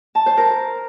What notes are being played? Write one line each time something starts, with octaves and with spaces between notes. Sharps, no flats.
A5
C5
A#4